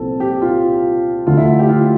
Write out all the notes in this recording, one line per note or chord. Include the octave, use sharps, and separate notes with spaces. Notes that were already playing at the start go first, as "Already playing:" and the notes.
Already playing: C2 A#2 F3 C4 A4
G4
F4
D2 D3 A3 F4
E4
G4
F4